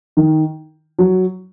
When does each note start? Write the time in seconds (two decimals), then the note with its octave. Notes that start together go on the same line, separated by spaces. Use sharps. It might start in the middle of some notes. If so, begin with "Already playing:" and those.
0.17 D#3
0.99 F#3